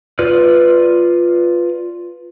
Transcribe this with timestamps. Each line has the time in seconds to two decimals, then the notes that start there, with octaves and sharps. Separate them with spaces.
0.19 F4 B4 D5 F6